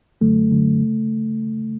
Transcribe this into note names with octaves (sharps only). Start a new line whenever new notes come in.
F#2 D3 F#3 A3
F#2 D3 F#3
C#3